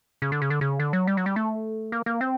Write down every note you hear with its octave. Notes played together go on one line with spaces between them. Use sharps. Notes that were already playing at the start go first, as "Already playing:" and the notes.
C#3
D3
C#3
D3
C#3
D3
F#3
G3
F#3
G3
A3
A#3
A#3
C4